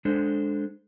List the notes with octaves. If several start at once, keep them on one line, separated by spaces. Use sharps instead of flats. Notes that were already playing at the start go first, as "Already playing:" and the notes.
G#3 D4 A4 C5